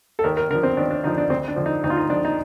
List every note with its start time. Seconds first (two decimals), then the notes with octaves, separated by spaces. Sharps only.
0.19 A4
0.24 D#2 A#4
0.37 A#4
0.50 D3 A#4
0.55 F3
0.63 C4
0.77 D#2 D4
0.91 D4
1.04 D3 F3 D#4
1.18 D4
1.30 D2 C4
1.48 D4
1.56 D3 F3
1.66 D#4
1.84 D2 D#4
1.90 F4
1.97 D#4
2.09 D3 F3 D4
2.25 D#4